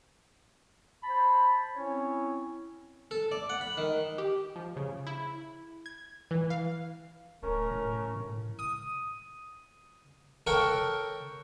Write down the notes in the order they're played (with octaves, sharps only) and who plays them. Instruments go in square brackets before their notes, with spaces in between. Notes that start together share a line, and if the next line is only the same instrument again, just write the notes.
[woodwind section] C5 A5 B5
C4 C#4 E4 C#5
[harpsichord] A4
D5
F#5
B5
D#3
[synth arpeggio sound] G4
F3
C#3
E4
G#6
E3
F5
[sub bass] D1 [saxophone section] A3 C#4 A#4
[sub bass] A2
A2
[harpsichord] D#6
A4 A#4 C#5 F#5 G5